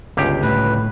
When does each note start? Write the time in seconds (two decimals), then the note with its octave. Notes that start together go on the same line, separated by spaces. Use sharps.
0.17 G1 C#2 G4
0.43 A2 B4